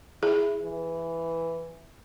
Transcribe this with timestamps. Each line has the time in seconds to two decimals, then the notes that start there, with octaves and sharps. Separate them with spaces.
0.23 E4 G#4
0.63 E3